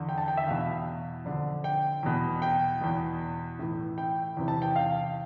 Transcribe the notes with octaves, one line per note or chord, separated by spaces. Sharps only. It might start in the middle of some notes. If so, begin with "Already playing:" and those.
Already playing: E2 D3
G5
A5
G5
E5
E2 B2 F5
F2 D3
G5
E2 B2
G5
E2 B2
A2 E3
G5
E2 C3 E3
A5
G5
F5